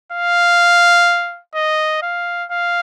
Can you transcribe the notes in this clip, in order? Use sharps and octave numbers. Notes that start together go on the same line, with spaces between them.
F5
D#5
F5
F5